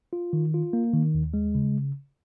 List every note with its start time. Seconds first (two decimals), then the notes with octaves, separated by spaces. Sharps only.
0.13 F4
0.33 D#3
0.54 F4
0.73 A#3
0.94 D#3
1.14 D#2
1.34 G#3
1.55 C#3